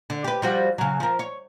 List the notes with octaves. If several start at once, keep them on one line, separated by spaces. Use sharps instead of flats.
D3
G4 B4
F3 G3 F#4
C#3 F#3
F3 A#4
C#5